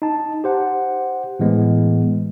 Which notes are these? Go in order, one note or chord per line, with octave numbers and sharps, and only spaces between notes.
D#4 A5
G4 C5 F#5
A2 E3 G#3 B3